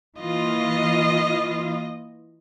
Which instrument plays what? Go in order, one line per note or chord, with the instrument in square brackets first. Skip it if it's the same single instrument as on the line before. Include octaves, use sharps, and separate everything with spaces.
[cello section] E3 A#3 F4 [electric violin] D#5